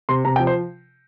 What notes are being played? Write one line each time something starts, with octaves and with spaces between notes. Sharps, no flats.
C3 C6
C3 A#5
G5
F3
C5